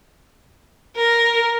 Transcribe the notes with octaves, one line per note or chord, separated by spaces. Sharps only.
A#4